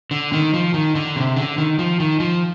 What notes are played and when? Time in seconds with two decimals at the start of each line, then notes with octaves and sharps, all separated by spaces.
0.11 D3
0.33 D#3
0.54 F3
0.74 D#3
0.95 D3
1.16 C3
1.36 D3
1.58 D#3
1.79 F3
2.00 D#3
2.20 F3